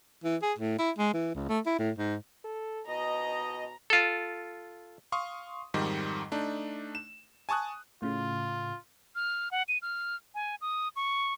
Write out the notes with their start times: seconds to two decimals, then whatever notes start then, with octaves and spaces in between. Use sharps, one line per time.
0.24 E3
0.42 G#4
0.59 A2
0.79 E4
0.98 G#3
1.14 E3
1.35 C#2
1.49 A3
1.66 E4
1.78 A2
1.99 G#2
2.45 A4
2.88 B2 D#5 A#5
3.90 F4 A4
5.12 F5 C6 C#6 D#6
5.74 F2 G#2 D#3 G3
6.32 A3 D4 D#4
6.95 E7
7.49 G#5 A5 C#6 D#6 F#6
8.02 A2 C#3 F4
9.15 F6
9.51 F#5
9.68 D#7
9.82 F6
10.35 G#5
10.61 D#6
10.96 C#6